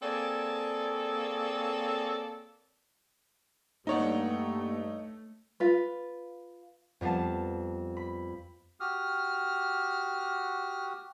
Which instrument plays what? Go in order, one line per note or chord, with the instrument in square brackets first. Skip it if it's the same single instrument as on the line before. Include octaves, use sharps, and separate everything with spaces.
[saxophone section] A#3 C4 G#4 A4 C#5 D5
[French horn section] G2 [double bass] A3 [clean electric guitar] A#3 D5 F#5 [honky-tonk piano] D#4 C#5
[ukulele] F4 B4
[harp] F2 G3 B3 F5 A5
B5
[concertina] F#4 G4 D#6 [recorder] F6